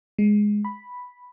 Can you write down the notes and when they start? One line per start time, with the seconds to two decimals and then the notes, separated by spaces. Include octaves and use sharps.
0.18 G#3
0.65 B5